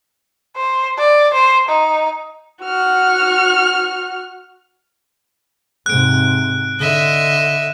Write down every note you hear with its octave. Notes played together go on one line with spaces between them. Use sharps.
C5
D5
C5
D#4
F#4 F6
G#2 C3 F#6 D7
D3 D#5 E5